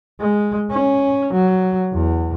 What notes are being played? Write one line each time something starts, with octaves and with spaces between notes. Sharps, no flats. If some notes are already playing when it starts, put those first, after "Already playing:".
G#3
C#4
F#3
E2